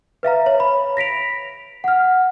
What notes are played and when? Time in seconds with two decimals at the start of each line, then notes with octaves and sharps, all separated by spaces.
0.23 B4 E5 F5 A#5
0.46 C#5
0.60 B5
0.97 A#6 B6 D7 F7
1.84 F#5 F6